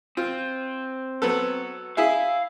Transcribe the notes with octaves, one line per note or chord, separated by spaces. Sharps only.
C4 F4
F#3 B3 A4
E4 G#4 E5 F5